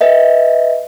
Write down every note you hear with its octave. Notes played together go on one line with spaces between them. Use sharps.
B4 D#5 E5